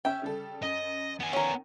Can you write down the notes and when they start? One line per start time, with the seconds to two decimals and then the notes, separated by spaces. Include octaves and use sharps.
0.05 C#4 E5 G5
0.22 C#3 G3 A4
0.62 F#2 D#5
1.20 B3 G#5
1.33 D#3 C#4 A#4